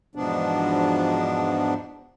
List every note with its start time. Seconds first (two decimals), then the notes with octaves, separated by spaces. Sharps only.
0.15 E2 G#2 B2 F3 B3 D4